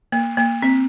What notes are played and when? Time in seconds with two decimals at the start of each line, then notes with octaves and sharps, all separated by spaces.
0.12 A#3
0.37 A#3
0.62 C4